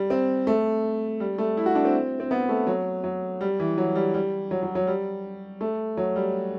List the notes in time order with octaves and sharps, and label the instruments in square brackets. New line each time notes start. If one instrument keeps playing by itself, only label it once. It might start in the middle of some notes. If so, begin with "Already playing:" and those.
Already playing: [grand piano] G3
C4
A3
G3
A3
E4
F#4
D4
C4
C4
B3
A3
F#3
F#3
G3
E3
F#3
G3
G3
F#3
F#3
F#3
G3
A3
F#3
G3